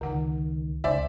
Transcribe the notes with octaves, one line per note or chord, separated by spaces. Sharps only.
C#2 D3 D#3 F#5
C#2 C5 D5 E5 G#5